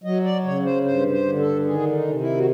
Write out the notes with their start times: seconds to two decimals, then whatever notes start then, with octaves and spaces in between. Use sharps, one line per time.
0.04 F#3 D#5
0.24 D5
0.44 C#3 C#5
0.65 C5
0.85 G2 C5
1.12 C5
1.26 D3
1.39 A4
1.65 D#3 G#4
1.92 D#4
2.07 C3
2.20 E4
2.37 F#4